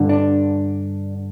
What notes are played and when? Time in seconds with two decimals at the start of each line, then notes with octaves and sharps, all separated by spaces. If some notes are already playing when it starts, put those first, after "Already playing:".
Already playing: G2 D3
0.09 D4